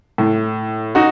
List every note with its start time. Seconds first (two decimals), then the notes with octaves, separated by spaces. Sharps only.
0.18 A2
0.95 D#4 F#4